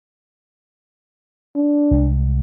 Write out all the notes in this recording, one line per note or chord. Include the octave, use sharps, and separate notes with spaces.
D4
C2 G#3